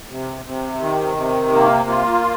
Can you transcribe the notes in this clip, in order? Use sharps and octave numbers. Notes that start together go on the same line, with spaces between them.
C3
C3
D#3
C3
A#3
F4